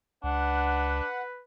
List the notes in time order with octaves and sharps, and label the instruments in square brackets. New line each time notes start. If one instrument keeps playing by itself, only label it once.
[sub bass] C#2 [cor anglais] D4 [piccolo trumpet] B4 [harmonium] F#5